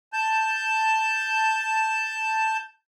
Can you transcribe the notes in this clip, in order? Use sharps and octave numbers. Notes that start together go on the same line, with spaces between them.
A5 G6